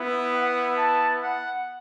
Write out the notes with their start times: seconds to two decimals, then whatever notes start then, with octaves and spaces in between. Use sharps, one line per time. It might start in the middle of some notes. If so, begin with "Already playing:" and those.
Already playing: B3 E4
0.33 F#5
0.77 A5
1.20 F#5